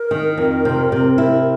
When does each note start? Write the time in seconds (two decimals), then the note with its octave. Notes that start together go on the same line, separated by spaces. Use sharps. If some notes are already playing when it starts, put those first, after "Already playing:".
Already playing: A#4
0.11 D#3
0.38 F2
0.65 C3
0.92 C3
1.18 E4